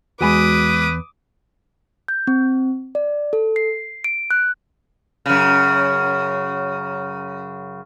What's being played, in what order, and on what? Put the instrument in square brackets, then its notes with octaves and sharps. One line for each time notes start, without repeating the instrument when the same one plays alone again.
[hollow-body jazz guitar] E2 G#5 B5 [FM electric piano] G#3 F#4 [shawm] B4 [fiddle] D6 D#6
[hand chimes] G6
C4
D5
A4
C7
D7
F#6
[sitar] F#2 C#3